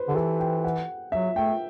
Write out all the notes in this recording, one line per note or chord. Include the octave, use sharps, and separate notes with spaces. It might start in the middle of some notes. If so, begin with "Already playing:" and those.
Already playing: B4 C5
D3 G4
E3 A4
G5
F#5
F#3 E5
A3 G5